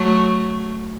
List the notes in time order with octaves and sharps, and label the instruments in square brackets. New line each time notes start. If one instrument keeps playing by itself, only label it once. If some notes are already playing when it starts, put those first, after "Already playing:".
Already playing: [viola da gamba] F#3 A3